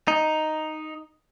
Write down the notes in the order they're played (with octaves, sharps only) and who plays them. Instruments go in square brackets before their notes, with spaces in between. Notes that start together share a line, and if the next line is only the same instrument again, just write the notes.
[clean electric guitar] D#4